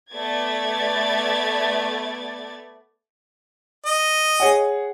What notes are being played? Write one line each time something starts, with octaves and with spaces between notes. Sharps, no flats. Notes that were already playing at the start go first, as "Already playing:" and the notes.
A3 B3 D5 G#6 A6
D#5
G#4 C#5 F#5